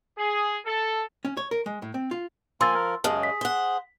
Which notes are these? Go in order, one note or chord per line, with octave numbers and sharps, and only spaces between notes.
G#4
A4
C#4
C#5
A#4
G#3
A2
C4
F4
F3 A#3 G#5 C6 E6 A6
A#4
F#2 C#3 G#3 G#4 A5 F6
B6
C5 F#5